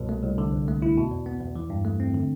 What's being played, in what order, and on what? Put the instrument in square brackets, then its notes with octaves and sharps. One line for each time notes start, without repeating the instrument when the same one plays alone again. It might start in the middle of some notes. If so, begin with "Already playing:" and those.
Already playing: [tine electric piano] C2 B2
A3
C2
D3
D2
A3
E4
B2
E2
B3
E2
E3
G2
A3
C4
D3